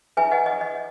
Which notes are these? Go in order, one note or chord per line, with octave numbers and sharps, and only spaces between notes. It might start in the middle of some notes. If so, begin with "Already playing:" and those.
E4 B4 E5 G#5
D#5 F#5
D#5
D#5